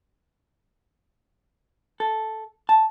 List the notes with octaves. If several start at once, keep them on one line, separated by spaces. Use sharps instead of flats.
A4
A5